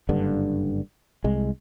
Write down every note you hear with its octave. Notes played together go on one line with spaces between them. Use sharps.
F#1 G2 D3
C2 G#3